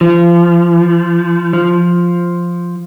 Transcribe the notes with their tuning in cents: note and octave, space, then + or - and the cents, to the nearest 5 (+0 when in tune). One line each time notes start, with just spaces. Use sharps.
F3 -25
F3 +0